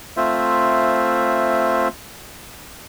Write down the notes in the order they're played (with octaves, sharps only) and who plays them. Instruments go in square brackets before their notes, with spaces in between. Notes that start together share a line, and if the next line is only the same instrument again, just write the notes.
[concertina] A3 C4 F4 C5 E5